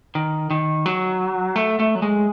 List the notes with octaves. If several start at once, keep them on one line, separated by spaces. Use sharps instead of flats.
D#3
D#3
F#3
A3
A3
F#3
G#3